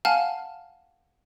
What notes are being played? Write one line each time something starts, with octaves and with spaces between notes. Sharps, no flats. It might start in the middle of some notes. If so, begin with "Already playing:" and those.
F5 F#5 G#5 A5 F6